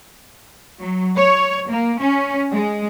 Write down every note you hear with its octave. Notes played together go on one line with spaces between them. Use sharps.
F#3
C#5
A#3
C#4
G#3